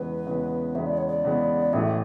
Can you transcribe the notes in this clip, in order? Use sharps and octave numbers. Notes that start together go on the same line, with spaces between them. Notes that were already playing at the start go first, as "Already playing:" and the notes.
Already playing: E2 C#3 G#3 B3 B4
E2 C#3 G#3 B3
E2 C#3 G#3 B3 E5
D5
C#5
D5
E2 C#3 G#3 B3
A1 A2 E3 E5